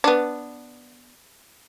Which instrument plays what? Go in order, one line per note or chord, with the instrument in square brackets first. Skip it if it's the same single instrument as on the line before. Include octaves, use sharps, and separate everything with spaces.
[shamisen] B3 D4